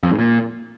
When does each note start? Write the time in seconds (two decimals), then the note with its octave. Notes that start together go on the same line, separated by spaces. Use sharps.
0.03 F2
0.11 G#2
0.19 A#2